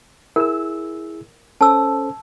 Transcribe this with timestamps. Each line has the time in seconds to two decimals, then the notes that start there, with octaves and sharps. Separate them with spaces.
0.36 E4 G#4 A#4 E6
1.61 C#4 A4 C5 A5 E6